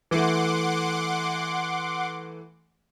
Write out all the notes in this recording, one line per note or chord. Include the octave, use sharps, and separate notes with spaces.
E3 A3 F#5 C6 D6